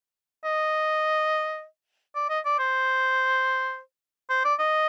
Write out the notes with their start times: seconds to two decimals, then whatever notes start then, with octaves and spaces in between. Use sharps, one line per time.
0.44 D#5
2.15 D5
2.29 D#5
2.45 D5
2.59 C5
4.30 C5
4.44 D5
4.59 D#5